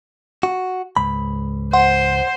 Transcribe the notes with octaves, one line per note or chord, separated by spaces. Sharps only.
F#4
C#2 G#2 B5
C5 F#5 C6